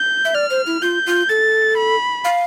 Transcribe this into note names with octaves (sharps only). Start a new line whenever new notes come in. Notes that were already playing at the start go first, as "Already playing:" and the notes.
Already playing: G6
E5
D5 F6
C5
E4
F4 G6
F4
A4 A6
B5
F5